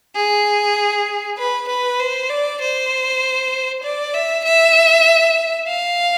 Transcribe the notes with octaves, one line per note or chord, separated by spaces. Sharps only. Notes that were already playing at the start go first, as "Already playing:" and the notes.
G#4
B4
B4
C5
D5
C5
D5
E5
E5
F5